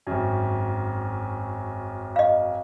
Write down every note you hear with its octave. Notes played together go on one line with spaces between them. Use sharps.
G#1 F#2
D#5 F5